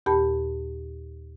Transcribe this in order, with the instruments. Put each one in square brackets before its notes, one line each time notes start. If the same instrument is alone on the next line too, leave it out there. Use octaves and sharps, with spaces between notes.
[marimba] D#2 A#2 G4 A#4 A5 B5